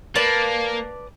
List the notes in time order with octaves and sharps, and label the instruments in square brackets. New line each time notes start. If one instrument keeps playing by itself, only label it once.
[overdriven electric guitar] A#3 [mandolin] B4 D5 A5